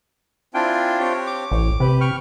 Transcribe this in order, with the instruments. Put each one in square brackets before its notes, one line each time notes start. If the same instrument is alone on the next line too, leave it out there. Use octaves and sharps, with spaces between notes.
[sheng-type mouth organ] C4 E4 G#5 [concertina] D4 F4 G5
[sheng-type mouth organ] C4 G4 C#5
[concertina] D6
[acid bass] A1 [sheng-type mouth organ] C#5
[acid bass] C3 [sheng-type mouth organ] G4 B4
[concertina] G5 C#6 F6